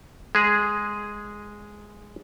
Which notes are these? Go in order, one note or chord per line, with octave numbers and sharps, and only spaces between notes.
G#3 G#4